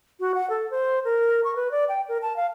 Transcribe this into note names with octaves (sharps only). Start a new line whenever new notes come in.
F#4
F#5
A4
C5
A#4
C#6
B4
D5
G5
A#4
A5
F5